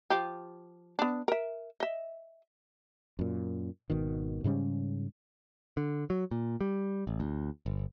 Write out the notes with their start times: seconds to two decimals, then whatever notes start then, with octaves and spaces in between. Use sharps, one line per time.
0.10 F3 F4 G4
0.99 B3 D4
1.28 A#4 E5
1.80 D#5 E5
3.19 F#2 A#2
3.90 G#1 B2 D#3
4.44 G#2 C#3 G3 C#4
5.77 D3
6.10 F#3
6.31 A#2
6.61 G3
7.07 A1
7.20 D2
7.66 G1